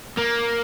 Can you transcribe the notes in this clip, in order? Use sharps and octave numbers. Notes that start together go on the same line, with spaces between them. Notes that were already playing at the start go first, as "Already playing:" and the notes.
A#3